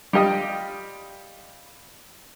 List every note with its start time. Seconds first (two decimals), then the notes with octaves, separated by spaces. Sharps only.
0.13 G3 F4 G4 D#5